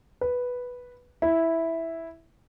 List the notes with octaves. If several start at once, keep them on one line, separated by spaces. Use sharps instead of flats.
B4
E4